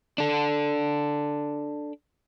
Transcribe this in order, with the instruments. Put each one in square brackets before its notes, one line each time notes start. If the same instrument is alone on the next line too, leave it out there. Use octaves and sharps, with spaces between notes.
[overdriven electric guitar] D4 A4